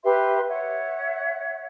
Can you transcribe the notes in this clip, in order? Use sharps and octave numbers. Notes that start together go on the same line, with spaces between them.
G4 B4 E5 C6
C#5 E5 F#5